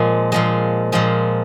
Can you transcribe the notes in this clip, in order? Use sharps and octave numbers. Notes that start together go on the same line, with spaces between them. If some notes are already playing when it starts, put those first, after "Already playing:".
Already playing: A#2 F3 G#3
A#2 F3 G#3
A#2 F3 G#3